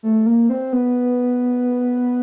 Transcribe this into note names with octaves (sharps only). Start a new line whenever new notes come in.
A3
A#3
C4
B3